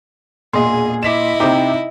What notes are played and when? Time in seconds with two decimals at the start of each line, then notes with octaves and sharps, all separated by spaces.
0.53 E1 A#2 G#4 D#5 C6
1.03 E4 D#5 D6 B6 E7
1.40 C3 C4 D#4 E5 G5 D6